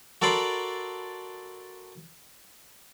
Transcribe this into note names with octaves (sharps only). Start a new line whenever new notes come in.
F#4 A4 A#4 D5 B5 C6